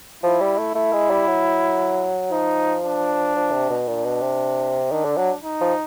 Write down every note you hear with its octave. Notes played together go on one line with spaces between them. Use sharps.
F3 E4
G3
A3
A3 E4
G#3
G3
F#3
F3 D#4
D4
F3
C3
B2
A#2 D4
B2
C3
D#3 D4
D3
F#3
D#4
F3